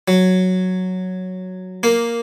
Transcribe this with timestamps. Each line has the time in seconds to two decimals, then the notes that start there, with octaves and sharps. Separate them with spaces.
0.08 F#3
1.83 A#3